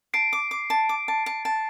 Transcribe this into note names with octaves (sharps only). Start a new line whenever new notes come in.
A5 C7 D7
D6
D6
A5
D6
A5
A5
A5